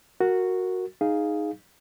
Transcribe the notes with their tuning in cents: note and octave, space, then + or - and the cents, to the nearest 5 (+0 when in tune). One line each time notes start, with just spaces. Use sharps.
F#4 -5 A#4 -10
D#4 +0 G#4 +0 F5 +0